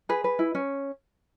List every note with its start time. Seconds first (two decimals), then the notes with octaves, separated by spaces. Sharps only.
0.09 G#4 B4
0.24 B4
0.39 E4
0.55 C#4